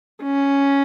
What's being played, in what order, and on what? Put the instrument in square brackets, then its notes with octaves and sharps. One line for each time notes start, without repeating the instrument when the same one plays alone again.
[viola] C#4